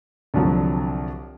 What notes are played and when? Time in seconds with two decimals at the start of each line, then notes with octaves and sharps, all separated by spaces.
0.34 C2 D3 F3 F#3